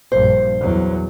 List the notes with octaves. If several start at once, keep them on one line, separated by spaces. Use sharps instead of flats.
A#1 G2 C5
E2 F#3